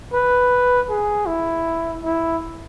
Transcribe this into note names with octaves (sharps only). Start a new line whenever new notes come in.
B4
G#4
E4
E4